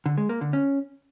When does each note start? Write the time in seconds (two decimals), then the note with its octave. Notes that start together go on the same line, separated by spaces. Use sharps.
0.06 D3
0.18 G#3
0.29 A#3
0.41 D3
0.53 C#4